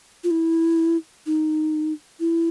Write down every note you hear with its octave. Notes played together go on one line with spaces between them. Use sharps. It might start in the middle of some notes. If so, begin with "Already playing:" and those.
F4
E4
D#4
E4